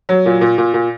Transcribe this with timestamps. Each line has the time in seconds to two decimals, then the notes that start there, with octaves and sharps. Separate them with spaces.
0.09 F#3
0.26 A#2
0.41 A#2
0.58 A#2
0.74 A#2